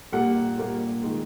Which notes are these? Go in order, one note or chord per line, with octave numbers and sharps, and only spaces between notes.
A#2 G3 A#3 F#5
A#2 G3 A#3
D#3 G#3